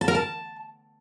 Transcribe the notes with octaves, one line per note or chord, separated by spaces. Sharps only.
A5
A#4
A5